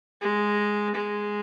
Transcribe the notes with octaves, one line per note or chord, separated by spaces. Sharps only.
G#3
G#3